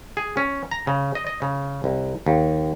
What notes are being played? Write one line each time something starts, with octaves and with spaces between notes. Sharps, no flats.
G#4
C#4
A#5
C#3
D#5
D#5
C#3
C2
D#2